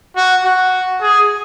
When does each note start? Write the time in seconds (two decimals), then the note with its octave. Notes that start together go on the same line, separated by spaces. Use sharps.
0.16 F#4
0.44 F#4
1.01 G#4